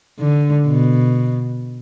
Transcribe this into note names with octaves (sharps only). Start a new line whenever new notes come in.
D3
B2